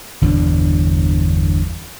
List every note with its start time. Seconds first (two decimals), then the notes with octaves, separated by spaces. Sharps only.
0.22 G1 E2 B2 D4